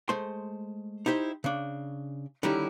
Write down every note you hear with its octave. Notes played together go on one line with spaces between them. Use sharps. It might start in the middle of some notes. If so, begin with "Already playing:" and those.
G#3 A3 C5 C6
D#4 E4 G4 C5
C#3 D4
D3 D#3 G3 C#4 D#4 E4